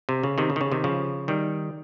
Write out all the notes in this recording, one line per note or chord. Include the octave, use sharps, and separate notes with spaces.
C3
C#3
C3 D#3
C#3
D#3
C#3
C3 D#3
C#3 F3
D#3 G3